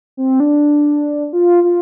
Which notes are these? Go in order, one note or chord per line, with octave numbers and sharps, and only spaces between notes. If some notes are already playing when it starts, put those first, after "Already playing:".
C4
D4
F4
F4